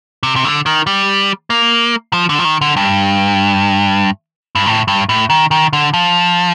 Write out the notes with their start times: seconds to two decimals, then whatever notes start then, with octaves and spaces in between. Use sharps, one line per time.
0.23 C3
0.36 C3
0.45 D3
0.66 D#3
0.87 G3
1.50 A#3
2.13 F3
2.29 D3
2.39 F3
2.45 D#3
2.61 D3
2.77 G2
4.55 G2
4.66 A2
4.88 G2
5.09 A2
5.30 D#3
5.51 D#3
5.73 D3
5.94 F3